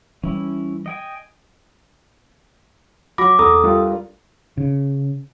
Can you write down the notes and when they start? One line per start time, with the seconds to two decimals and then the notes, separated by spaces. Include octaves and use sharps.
0.24 E3 G3 C#4 E4
0.86 D#5 G5 G#5
3.18 F#3 F#4 B5 D6 A#6
3.39 E2 B2 A4 A#5 D#6
3.64 G3 D4 F4 A#4
4.58 C#3